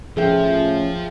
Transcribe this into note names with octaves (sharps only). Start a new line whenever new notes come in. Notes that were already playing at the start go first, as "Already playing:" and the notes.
A2 F3 A3 C#4 G#4 E5 G5